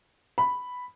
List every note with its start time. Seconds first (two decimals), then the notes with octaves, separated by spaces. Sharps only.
0.38 B5